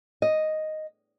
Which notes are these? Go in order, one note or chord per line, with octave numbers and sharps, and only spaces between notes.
D#5